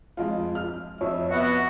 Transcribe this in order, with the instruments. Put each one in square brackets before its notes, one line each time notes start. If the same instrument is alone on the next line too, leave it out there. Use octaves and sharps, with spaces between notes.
[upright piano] F2 G#3 F4
F6
[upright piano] F2 [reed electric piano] C#5 [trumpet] E5
[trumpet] B3 [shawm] F#4 [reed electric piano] E5